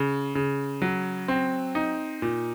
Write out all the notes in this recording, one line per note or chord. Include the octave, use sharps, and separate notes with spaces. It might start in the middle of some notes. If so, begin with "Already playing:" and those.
Already playing: C#3
C#3
F#3
C4
D#4
A#2